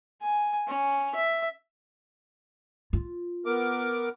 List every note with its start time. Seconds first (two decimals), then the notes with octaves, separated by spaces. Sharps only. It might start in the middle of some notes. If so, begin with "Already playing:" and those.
0.21 G#5
0.68 C#4
1.15 E5
2.93 F4
3.46 B3 A#4 D6